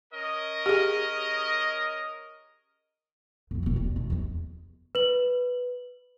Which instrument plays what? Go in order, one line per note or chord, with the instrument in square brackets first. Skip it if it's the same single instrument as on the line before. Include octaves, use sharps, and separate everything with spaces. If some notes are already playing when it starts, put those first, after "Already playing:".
[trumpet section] C#4 A#4 D#5
[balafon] G4 G#4
[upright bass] B1 F2
E1 C4
G3
A3 D#4
E2 D#3
[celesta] B4 F#7